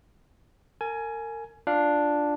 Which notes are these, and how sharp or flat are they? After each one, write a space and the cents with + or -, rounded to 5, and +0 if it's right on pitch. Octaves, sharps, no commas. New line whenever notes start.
A#4 -35 G#5 +15
D4 +0 F4 +0 F5 +0